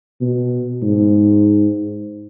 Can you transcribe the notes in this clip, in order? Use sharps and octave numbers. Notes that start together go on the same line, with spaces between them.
B2
G#2